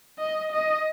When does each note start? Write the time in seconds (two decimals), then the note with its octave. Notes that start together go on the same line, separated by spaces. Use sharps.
0.19 D#5
0.52 D#5